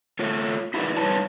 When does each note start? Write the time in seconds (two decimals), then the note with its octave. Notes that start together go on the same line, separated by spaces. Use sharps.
0.19 A3 F4 C#5
0.74 D#4 E4 F#4 G#4 B4 D5
0.97 G2 G#3 D#4 B4 C#5 A5